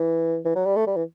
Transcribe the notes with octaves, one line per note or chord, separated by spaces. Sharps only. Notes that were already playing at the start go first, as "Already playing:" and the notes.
Already playing: E3
E3
F#3
G3
A3
G3
E3